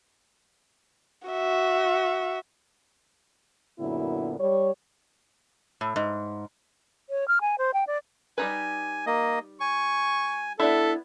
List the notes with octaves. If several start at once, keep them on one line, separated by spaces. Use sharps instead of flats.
F#4 E5
F#2 A#2 D3 B3 E4
G3 C#5
A2
G#2
C#5
F6
G#5
C5
G5
D5
G3 D#4 B4 G#5
A#3 D#5
G#5 C#6
B3 D4 E4 A4 E5